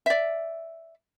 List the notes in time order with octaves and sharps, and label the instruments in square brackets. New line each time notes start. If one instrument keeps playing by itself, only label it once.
[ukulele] D5 E5